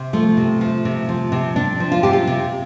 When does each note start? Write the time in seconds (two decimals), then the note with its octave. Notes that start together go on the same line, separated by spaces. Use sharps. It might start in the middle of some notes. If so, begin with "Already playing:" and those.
Already playing: C3
0.13 F3 A3
0.37 C3
0.61 F3
0.85 C3
1.09 F3
1.32 C3
1.56 C3 D4
1.80 F3
1.92 F4
2.03 C3 G4
2.13 F4
2.27 C3